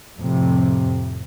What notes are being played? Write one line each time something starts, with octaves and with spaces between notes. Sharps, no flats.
F2 A2 C3